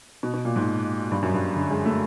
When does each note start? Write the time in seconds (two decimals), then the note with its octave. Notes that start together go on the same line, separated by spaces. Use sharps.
0.23 B2
0.34 B2
0.45 A#2
0.56 G#2
1.12 G2
1.22 F#2
1.34 G2
1.56 D3
1.71 G#3
1.85 A3